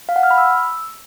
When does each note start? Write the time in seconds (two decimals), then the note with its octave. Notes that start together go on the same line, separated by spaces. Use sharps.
0.09 F5
0.16 F#5
0.23 F6
0.31 B5
0.38 E6